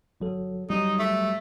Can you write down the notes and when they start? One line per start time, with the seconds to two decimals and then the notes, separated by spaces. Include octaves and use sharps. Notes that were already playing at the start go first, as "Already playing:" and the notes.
0.20 G1 F#3 A4
0.70 G1 F#3 G3 D#4
0.99 A3